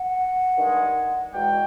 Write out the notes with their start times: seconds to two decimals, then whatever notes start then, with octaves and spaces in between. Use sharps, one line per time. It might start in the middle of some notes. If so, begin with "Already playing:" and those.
Already playing: F#5
0.56 G2 D#3 G#3
1.33 E2 B2 G#3 G5